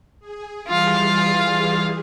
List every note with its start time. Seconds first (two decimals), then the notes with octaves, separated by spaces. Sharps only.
0.19 G#4
0.68 E3 G3 F4 G#4 F5